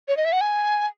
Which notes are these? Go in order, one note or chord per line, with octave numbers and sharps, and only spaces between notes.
C#5
D#5
E5
F#5
G#5